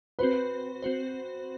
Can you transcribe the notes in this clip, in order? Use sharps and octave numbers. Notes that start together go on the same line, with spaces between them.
C4 F#4 B4 C5
C4 F#4 C5